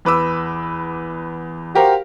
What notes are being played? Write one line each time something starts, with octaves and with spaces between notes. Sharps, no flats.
E2 B4 D6 E6
F#4 G4 A#4 C5 F5 F#5